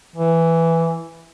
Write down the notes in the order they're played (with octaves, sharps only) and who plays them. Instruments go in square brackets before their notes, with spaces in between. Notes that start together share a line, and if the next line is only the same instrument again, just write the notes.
[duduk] E3